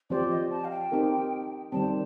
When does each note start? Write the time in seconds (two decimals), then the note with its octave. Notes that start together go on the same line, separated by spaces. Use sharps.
0.10 F3 C4 G4 C5 D5
0.30 D#5
0.51 A5
0.65 F5
0.71 G5
0.92 C4 D#4 G4 A#4
1.72 D#3 G3 C4 A5